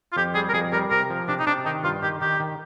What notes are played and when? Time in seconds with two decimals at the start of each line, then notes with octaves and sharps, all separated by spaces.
0.12 F4
0.16 F2 G4
0.35 G3 G#4
0.49 A#4
0.54 F2 G#4
0.72 G3 A#4
0.91 C3 A#4
1.10 F3
1.28 C3 D4
1.39 D#4
1.47 C3 D4
1.65 D#3 D#4
1.84 G2 F4
2.03 D#3 G4
2.21 D#3 G4
2.40 D#3